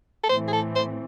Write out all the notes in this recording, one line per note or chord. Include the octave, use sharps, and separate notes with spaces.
A4
A2 E3 A3 C4 C5
G#4
A4
C5